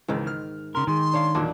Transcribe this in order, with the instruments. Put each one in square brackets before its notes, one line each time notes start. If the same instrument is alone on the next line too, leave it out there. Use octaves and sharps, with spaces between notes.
[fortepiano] C#2 E3 [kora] G#2 D#3
[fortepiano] F6
[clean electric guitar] C#3 A#4 [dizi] C6
[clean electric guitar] D#3 [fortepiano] G#3 [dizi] C6
[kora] D4 C#5 F5
[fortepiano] B1 E2 A#2 [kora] D4